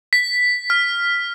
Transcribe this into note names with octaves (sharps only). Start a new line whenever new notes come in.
B6
F6